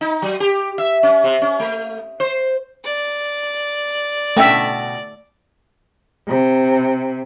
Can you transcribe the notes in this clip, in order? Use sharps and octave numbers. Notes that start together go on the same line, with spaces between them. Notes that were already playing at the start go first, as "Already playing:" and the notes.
D#4
F#3
G4
E5
C#4
C3
C#4
A3
C5
D5
B2 A3 C#4 E5 G5
C3